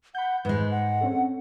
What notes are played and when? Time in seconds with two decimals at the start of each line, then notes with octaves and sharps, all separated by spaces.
0.15 F#5 B5 G6
0.45 G#2 G#3 B4
0.71 F#5
1.01 C4 C#4 A4